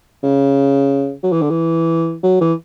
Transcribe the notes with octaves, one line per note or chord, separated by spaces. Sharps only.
C#3
F#3
E3
D3
E3
F#3
E3